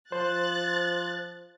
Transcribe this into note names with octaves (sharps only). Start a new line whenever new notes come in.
F3 C5 F#6 A6